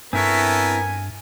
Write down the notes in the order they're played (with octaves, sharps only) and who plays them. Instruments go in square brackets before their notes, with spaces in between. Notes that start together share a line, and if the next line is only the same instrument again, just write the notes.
[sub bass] G2 [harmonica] B3 A4 A#4 [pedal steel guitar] C4 E4 C#5 [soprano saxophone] G#5